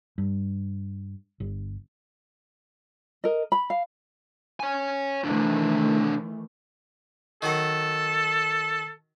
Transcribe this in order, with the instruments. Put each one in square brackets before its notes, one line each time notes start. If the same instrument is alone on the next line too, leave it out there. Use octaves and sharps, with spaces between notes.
[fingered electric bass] G2
G1
[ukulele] A#4 D#5
B5
F5
[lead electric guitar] C#5 G#5
[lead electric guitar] C3 D4 [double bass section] D#3 E3 A3
[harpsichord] D#3 F#3 F#5 [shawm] A4